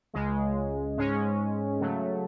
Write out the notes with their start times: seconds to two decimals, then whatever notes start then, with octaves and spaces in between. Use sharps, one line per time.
0.14 C#2 C#3 G#3
0.97 G#2 G#3 C#4
1.80 C#3 F#3 A3